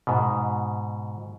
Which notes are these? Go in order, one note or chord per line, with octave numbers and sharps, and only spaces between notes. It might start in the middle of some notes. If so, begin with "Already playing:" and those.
G#2 B2